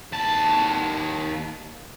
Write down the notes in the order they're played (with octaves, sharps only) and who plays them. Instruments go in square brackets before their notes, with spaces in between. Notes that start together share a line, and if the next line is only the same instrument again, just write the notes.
[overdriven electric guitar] D#2 A5